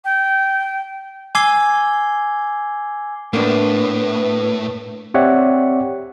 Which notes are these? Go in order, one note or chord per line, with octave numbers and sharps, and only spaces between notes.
G5
G#5 D6 E6 G#6 C7 G7
A2 A#3 B3 D4 B4
C4 G4 C#5 D5 E5 F#5